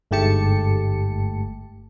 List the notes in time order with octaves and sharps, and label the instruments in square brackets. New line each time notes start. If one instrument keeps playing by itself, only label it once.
[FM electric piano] G1 G#2 A3 G4 A5 C#7